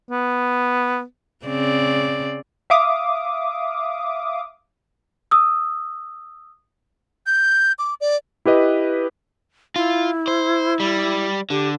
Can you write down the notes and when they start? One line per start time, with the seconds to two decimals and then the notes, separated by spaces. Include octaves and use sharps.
0.10 B3
1.46 C#3 C4 D5
2.70 E5 F5 D6 D#6
5.31 D#6 E6
7.26 G6
7.79 D6
8.01 D5
8.45 E4 G4 B4 D#5
9.76 E4 F4
10.28 C5
10.80 G3
11.50 D3 G4